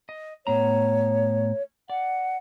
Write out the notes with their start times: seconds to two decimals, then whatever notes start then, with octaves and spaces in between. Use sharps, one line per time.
0.09 D#5
0.47 A2 B3 C#5 A#5
1.90 D5 F#5